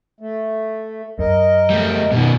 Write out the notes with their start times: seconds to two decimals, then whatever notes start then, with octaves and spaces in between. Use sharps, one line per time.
0.20 A3
1.19 F#2 A#4 D#5
1.70 G3 A3
2.12 B2 D#3